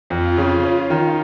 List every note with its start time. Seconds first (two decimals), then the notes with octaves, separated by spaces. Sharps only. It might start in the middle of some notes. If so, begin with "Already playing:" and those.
0.10 F2 F4
0.38 C#3
0.63 C#4 F4
0.90 D#3